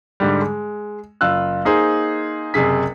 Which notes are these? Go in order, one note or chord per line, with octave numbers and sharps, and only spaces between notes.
G#2 D3 G3
G#3
F#1 F4 E6 F#6
A#3 D#4 G#4 C5
F#1 C3 G#4 B6